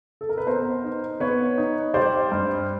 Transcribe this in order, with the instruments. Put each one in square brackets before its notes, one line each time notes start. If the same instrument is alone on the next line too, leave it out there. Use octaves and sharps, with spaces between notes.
[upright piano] A4
A#4
B4
B3 A#4 C5
D#4
B3 B4 C#5
D#4
G3 C5 D5
G2